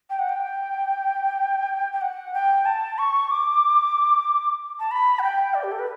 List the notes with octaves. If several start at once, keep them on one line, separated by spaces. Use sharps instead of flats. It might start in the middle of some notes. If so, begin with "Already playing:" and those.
G5
F#5
G5
G5
F#5
G5
A5
C#6
D6
A5
B5
F#5
G5
D5
G4
A4
B4